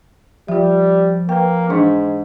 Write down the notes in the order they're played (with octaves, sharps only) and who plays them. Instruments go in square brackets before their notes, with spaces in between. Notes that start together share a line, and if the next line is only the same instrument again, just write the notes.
[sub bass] F3 [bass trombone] G3 [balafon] F4 E5
[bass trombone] A#3 [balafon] B4 G5
[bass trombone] G#2 [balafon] E3 D4 D#4